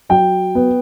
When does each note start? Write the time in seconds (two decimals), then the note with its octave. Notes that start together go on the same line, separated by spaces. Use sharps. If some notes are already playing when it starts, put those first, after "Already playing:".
0.09 F#3 G5
0.55 B3